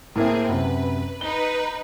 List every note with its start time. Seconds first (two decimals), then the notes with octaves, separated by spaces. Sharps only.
0.16 A2 A#3 C4 G#4 E5
0.49 F#2 C3 B4
1.21 D#4 B4 G7